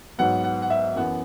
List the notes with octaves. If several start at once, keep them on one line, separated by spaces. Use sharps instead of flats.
G#2 F#3 B3 F#5
F#5
F#5
E5
F#2 E3 B3 F#5